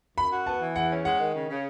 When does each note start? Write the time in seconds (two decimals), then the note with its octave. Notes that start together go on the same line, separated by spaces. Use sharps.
0.17 F#2 B5
0.32 F#4
0.47 B3 A5
0.61 E3
0.76 E2 F#5
0.91 C#4
1.05 G#3 F#5
1.20 D#3
1.34 C#3
1.49 C#3